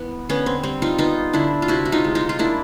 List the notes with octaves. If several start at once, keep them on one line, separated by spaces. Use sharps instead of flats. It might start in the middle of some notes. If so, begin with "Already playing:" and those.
Already playing: E3 B3
D3 B3 C#4
C4
G3 C4
D#4 F4
B3 D#4 F4
D3 D4 E4
F4
C3 E4 F#4
F#4
D#4 F4
G#3
D#4 F4
F4
A#3 D4 E4